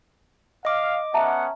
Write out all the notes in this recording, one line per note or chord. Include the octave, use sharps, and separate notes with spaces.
D#5 F5 D6
B3 C#4 E5 F#5 A5 A#5